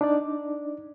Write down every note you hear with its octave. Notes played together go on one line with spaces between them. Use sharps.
D4 D#4 D5